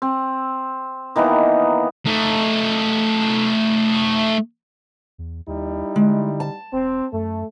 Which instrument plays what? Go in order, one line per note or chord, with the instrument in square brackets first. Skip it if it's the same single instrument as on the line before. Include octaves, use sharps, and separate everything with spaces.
[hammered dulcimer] C4
D#3 E3 A#3 B3
[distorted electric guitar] A3 D#4
[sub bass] E2
[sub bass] D#2 [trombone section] G3 D#4 E4
[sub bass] D3 [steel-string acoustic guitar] G#3
[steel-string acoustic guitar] A5
[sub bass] E1 [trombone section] C4
[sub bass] F#2 [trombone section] A3